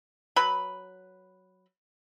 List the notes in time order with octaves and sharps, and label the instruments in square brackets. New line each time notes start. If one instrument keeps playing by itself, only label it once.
[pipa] F#3 B4 B5